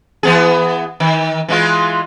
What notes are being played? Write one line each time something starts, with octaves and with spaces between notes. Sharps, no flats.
E3 B3 G#4
D#3
E3 G#3 F4